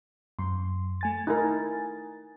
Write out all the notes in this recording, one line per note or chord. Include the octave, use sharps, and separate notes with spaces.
F#2 C6
A3 G#5 A6
D#4 E4 A#4